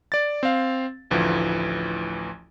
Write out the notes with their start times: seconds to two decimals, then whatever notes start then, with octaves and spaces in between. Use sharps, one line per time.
0.12 D5 A6
0.43 C4 F5
1.11 A1 D2 E3 F3